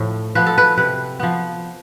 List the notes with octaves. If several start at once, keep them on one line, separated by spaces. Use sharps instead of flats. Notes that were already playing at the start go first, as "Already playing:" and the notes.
Already playing: A2 F3
F3 B3 B4
A4
B4
C3 B4
F3 B3